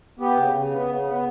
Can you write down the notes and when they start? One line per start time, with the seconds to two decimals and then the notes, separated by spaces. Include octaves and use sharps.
0.19 B3 G4
0.37 C#3
0.55 C#3
0.72 B3
0.89 C#3
1.06 B3